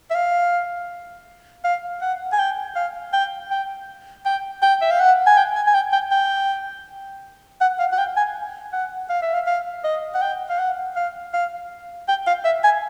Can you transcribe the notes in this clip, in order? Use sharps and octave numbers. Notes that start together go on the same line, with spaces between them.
E5
F5
F5
F#5
G#5
G5
F5
G5
G5
G5
G5
E5
F5
F#5
G#5
G5
G#5
G#5
G5
G5
G5
F#5
F5
F#5
G5
G#5
F#5
F5
E5
F5
F5
D#5
F#5
G5
F5
F#5
F5
F5
G5
F5
E5
G#5